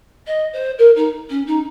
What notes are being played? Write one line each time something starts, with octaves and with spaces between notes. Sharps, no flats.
D#5
C5
A#4
D#4
C#4
D#4